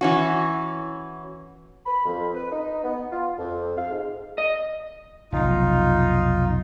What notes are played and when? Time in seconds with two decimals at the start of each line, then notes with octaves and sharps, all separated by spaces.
0.01 E3 C#4 F#4
1.86 B5
2.06 F2
2.35 B4
2.52 D#4
2.84 B3
3.12 F4
3.39 F2
3.77 F5
3.90 G#2
4.38 D#5
5.32 F1 B1 D#4 F4